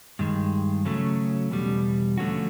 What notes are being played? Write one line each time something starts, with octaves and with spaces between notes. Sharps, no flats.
G2 D#3 G#3
C#3 F#3 A3 C#4
E2 B2 G3
D3 F3 A3 C#4 F#4